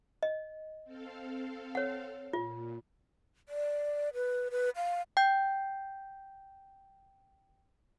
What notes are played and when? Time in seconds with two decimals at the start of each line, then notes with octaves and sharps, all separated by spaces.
0.23 D#5
0.84 C4 A4 F5
1.75 C#5 F#5
2.33 A#2 F4
3.49 D5
4.14 B4
4.51 B4
4.76 F5
5.17 G5 G6